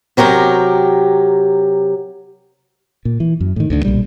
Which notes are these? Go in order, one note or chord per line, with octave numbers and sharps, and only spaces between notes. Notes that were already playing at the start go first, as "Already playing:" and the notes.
C3 F#3 G4 A#4
A#2
E3
F#2
A2 D#3
D2 D3
B1 A#2 G3